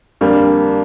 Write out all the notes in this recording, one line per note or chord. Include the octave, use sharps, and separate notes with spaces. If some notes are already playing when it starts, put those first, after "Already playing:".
F2 D3 G3 A#3